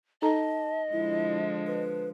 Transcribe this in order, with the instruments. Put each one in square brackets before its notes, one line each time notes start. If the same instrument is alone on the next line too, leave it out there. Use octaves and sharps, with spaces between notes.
[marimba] D#4 A4 A#5 [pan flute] D#5 [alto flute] A5
[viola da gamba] D3 F3 G#3 [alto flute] E4
[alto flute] B4